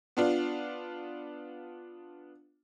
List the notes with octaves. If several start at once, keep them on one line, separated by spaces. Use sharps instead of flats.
B3 D4 F4